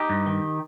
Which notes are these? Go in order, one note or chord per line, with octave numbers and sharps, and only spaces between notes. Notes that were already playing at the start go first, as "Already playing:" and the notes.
Already playing: D#4 G4
G2
D#3